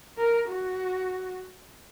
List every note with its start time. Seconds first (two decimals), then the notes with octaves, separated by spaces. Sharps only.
0.18 A#4
0.49 F#4